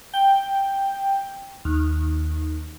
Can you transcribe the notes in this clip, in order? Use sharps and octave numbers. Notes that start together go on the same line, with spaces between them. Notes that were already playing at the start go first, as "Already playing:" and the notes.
G5
D#2